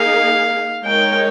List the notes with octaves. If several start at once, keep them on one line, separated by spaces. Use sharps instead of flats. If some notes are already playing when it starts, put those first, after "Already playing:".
Already playing: A#3 D#4 G#4 F5
G#3 D#4 A#4 C#5 G5